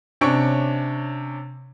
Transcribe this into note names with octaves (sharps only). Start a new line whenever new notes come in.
C3 C#4 D4 C#5 C#6 D7